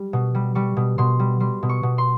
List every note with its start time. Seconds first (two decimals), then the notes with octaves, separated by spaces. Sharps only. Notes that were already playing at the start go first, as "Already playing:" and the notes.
Already playing: G3
0.13 B2
0.35 G3
0.55 G3 C#6
0.77 B2
0.98 B2 C6
1.19 G3
1.40 G3 C6
1.63 B2
1.69 C#6
1.83 B2
1.98 C6